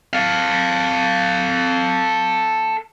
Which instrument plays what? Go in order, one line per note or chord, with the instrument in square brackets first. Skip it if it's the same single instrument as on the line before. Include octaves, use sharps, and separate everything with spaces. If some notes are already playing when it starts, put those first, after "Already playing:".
[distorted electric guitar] A4 F5